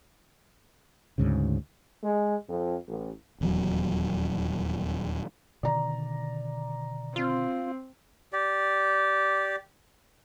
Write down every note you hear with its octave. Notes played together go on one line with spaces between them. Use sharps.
D2 G#2 C#3
G#3
F2
A1
D#1 E2 F#3
B2 D3 D#3 D5 A#5
C4 F4
G4 D5